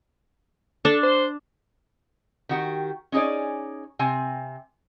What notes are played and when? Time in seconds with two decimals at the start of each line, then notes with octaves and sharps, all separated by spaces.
0.85 D4 A4 A5
1.03 C5
2.49 D#3 F#4 G4
3.12 C#4 D#4 G#4 C#5 D5
3.99 C3 C4 G#5